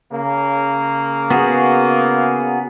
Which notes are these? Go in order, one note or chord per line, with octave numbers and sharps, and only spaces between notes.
C#3 A#3
B3 F#4 G#4